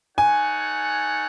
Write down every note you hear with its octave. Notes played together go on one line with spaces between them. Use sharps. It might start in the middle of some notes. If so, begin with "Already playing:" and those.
D#4 A4 C#5 F#5 G#5